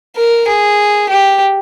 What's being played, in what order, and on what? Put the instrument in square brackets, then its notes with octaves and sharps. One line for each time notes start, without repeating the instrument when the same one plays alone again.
[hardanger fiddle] A#4
G#4
G4